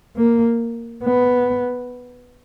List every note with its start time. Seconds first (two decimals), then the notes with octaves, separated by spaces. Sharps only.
0.16 A#3
1.04 B3